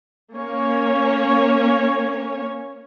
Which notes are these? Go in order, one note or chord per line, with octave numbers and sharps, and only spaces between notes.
A#3 C#4 C#5